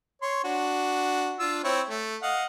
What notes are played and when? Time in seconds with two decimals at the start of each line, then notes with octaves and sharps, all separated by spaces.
0.22 C#5 C6
0.44 D4 F#4
1.39 D4 F4 E6
1.64 C4 E4 C#5
1.90 A3
2.22 D#5 F5 F#5